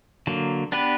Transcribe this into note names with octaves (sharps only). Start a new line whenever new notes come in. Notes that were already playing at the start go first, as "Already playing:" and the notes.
D3 F#3 A#3
B3 D4 G4 B4